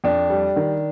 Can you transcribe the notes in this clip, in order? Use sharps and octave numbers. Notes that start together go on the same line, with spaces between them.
F2 D4
G3
D#3